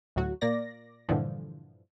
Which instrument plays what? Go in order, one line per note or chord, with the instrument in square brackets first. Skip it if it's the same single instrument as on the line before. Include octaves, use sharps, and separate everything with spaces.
[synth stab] D2 A2 F#3 F#4
A#2 A#3 D5 A#6
G2 A#2 D3 E3 F3